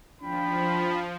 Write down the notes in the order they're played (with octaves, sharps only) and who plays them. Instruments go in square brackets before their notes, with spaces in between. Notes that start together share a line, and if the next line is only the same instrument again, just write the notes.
[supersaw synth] F3 [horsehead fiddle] D4 G5 [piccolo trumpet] B5